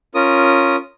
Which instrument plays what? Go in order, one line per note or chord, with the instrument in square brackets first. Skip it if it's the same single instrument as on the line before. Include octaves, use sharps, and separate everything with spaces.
[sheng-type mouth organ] C#4 F4 A#4 D#6